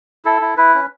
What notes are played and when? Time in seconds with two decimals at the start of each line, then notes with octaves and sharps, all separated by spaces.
0.25 E4 A4
0.41 E4
0.57 E4 B4
0.74 C#4